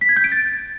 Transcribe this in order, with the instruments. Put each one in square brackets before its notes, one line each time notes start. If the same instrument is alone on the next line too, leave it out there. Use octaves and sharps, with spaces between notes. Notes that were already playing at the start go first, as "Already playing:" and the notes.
[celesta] B6
G#6
G6
D7
A6